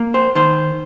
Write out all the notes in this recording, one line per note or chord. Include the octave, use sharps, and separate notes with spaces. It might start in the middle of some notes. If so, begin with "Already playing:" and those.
Already playing: A#3
C5
D#3 C5